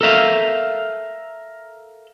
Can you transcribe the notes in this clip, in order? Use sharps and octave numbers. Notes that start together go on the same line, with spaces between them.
A4 A#4 E5 F5